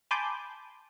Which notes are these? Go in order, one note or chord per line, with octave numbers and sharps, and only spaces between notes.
G#5 A5 B5 C6 D6 G6